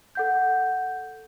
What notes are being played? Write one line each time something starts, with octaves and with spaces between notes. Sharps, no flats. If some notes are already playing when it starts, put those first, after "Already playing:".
A4 F#5 G6